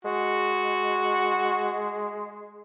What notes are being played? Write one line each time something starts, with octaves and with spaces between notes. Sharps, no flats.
G#3 F#4